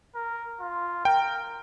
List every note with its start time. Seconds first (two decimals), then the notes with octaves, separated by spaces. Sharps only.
0.15 A#4
0.60 F4
1.05 A#4 G5